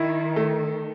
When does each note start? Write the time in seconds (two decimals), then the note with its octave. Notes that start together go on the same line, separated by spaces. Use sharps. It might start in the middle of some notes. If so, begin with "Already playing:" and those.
Already playing: D#3 E4
0.36 A3